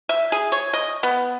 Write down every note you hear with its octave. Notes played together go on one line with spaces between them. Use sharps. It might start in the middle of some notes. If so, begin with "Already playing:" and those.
E5
G#4
C#5
D#5
B3